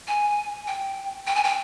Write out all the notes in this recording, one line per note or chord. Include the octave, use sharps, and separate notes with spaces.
G#5
G5
G5
G#5
G5